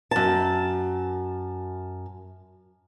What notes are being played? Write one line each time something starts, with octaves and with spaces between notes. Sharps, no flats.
F#2 A5